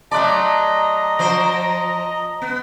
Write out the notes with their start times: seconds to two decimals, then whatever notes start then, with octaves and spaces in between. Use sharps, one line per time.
0.11 F#3 A3 D5 D#5 A5 A#5 C6 F#6
1.19 F3 C5
2.42 B3